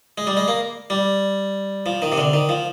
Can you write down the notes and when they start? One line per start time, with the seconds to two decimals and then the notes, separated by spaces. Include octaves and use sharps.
0.18 G#3
0.27 G3
0.37 G#3
0.48 A#3
0.90 G3
1.86 F3
2.02 D#3
2.12 C3
2.18 D3
2.33 D#3
2.49 F3